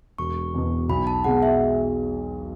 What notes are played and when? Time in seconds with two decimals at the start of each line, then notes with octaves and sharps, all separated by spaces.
0.18 E1 C#6
0.54 E2 B2
0.89 B1 B5
1.07 A5
1.24 B2 G#3 F#5
1.43 E5